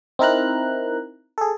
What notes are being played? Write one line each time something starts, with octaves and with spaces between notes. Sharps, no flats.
C4 D#4 E4 A#4 A#5 F#6
G#4 A4